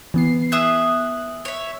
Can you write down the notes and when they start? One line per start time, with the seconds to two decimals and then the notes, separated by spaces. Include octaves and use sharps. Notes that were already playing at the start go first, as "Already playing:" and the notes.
0.14 E3 B3 C7
0.52 G#4 E5 D#6 F#6
1.45 C#5 E5